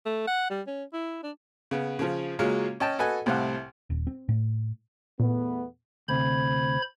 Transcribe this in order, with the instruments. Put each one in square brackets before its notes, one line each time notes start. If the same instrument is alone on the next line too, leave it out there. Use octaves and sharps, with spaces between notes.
[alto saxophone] A3
F#5
G3
C#4
E4
D4
[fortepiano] C#3 B3
C#3 F3
C#3 F#3 G#3 A#3 C#4 F4
C#4 D#5 G5 A5
F#4 A4 B4 D#5 G#5
C2 A2 C3 C5 F5 F#5
[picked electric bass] D#1
C4
A2
[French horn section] E2 A3 B3 [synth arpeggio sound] A#2
[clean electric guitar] D2 C3 [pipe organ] C5 B5 G#6